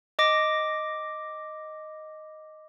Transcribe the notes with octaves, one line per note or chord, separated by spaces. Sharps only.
D#5 D6 A#6